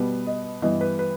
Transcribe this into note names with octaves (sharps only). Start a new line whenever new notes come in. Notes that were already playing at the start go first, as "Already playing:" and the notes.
Already playing: B2 G3 B3 B4
D#5
G2 E3 B3 D#5
B4
B4